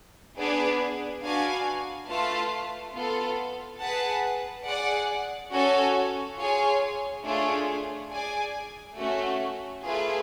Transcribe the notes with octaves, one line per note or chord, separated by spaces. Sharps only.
B3 D4 G#4 B4 D5
D4 F#4 B4 F5 G#5
A3 F4 B4 F5 A5
B3 F4 A4
G#4 B4 F#5 A5
G#4 D5 F#5
C#4 F#4 A4 C#5 G#5
F4 G#4 C#5 G#5
A3 D4 F4 G#4 C#5
G#4 D5 G#5
A3 C#4 F#4
A3 F4 G#4 B4